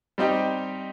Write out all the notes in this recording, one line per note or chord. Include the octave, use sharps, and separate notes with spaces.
G3 C4 D#4 G4